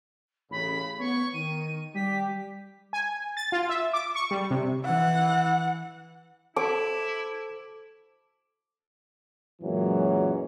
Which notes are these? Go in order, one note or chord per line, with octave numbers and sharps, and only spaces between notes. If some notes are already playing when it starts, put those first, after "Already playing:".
A1 C#3 B5
B3 C#5 C#6
D#3 D#7
G3 G4 B6
G#5
A6
F4
E5
D6
C#6
G3
C3
E3 F#5
E4 A4 C5 D6
F#2 A#2 E3 F#3 G#3